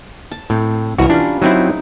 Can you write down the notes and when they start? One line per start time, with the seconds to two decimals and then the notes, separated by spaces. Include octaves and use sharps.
0.32 A5
0.50 A2 C4
0.98 C2 E3 F#4 A#4
1.10 G3 C#4 D4 F4
1.42 F#3 C4 D#4 E4